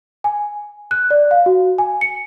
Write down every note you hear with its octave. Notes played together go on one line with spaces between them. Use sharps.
G#5
F#6
D5
F5
F#4
G#5
C#7